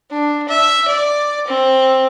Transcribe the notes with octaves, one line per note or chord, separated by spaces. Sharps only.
D4
E5
D5
C4